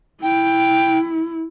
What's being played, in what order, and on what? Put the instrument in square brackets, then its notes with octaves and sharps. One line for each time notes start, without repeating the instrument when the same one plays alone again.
[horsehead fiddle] E4 [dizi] G5